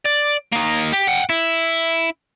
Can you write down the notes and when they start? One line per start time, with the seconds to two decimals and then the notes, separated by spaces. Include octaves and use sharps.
0.05 D5
0.53 A#3 D#4
0.93 G4
1.08 F#5 G5
1.30 E4